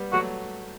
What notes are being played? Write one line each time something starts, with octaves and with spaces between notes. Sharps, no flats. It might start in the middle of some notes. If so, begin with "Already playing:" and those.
Already playing: G3 B3
F#3 A3 F#4